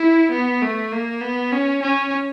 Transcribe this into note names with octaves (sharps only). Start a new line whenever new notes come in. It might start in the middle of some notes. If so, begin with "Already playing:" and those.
Already playing: E4
B3
A3
A#3
B3
C#4
C#4